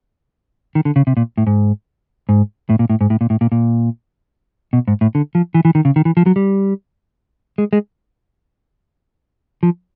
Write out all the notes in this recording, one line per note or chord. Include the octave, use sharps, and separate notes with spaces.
D#3
D3
C#3
C3
A#2
A2
G#2
G#2
A2
A#2
A2
G#2
A2
A#2
A2
A#2
A#2
B2
G#2
A2
D3
F3
E3
E3
D#3
C#3
D#3
E3
F3
F#3
G3
G#3
G#3
F3